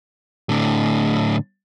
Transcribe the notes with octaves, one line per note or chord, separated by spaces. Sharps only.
A2 D3